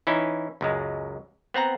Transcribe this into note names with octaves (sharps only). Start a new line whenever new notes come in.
E3 C#4 D#4 E4
C#2 F#2 G#3
B3 C4 F#5 A#5